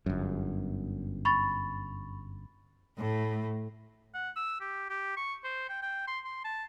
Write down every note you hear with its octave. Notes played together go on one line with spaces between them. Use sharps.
G1 F#2
B5 C#6 A6
A2 A3
F#5
E6
G4
G4
C#6
C5
G5
G5
C6
C6
A5